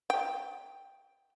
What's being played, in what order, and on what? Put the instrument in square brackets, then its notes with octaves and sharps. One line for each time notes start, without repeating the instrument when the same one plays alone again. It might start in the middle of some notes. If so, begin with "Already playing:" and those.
[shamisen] G5